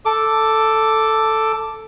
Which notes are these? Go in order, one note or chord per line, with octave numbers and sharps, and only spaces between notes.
A4 D6